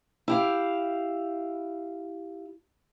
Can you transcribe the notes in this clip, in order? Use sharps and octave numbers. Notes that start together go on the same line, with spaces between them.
E4 G4 F5